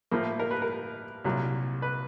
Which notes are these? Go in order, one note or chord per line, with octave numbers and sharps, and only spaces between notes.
A2 F3 A#3
A#4
B4
A#4
C2 A#2 F#3
B4